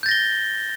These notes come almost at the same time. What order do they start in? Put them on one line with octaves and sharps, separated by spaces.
G6 A6 A#6 G7